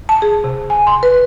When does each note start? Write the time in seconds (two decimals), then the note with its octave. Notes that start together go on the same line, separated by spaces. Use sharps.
0.09 A5
0.22 G#4
0.44 C3
0.70 G#5
0.87 C6
1.03 B4